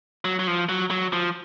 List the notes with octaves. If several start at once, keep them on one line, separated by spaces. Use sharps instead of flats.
F#3
F#3
F3
F#3
F#3
F3